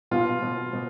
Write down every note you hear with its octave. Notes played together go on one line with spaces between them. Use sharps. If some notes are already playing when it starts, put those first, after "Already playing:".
B2 F4
B2
B2